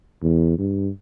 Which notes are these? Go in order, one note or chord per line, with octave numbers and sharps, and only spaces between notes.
E2
G2